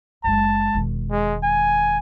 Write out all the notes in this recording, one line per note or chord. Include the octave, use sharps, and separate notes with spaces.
F#1 G#3 A5
E1 D#3
G#3
G#5